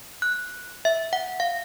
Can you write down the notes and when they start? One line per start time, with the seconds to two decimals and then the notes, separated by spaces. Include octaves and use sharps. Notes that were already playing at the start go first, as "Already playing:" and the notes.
0.22 F#6
0.85 E5
1.13 F#5
1.40 F5